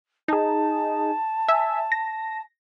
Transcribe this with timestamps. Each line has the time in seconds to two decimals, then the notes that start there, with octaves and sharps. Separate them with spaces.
0.28 D#4 G#4 A5
1.48 E5 G#5
1.92 A#6